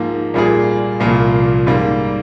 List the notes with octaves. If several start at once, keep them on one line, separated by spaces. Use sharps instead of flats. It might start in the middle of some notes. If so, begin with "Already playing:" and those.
Already playing: G#2 F3 A#3
A#2 G3 A#3 F4 G#4
C2 A#2 F3 A#3
G#2 G3 A#3